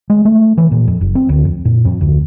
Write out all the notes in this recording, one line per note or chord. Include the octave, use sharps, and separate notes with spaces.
G#3
A3
E3
A#2
F2
F#1
C4
D2
F2
A#2
F2
D2